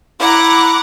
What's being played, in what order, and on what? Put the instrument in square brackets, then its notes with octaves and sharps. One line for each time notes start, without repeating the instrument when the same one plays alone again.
[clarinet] E4 [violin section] F#5 A#5 D6